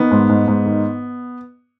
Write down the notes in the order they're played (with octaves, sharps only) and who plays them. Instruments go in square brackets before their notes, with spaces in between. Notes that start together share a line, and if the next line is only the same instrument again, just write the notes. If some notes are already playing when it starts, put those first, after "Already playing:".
Already playing: [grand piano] D#3 B3
G#2
G#2
G#2
D#3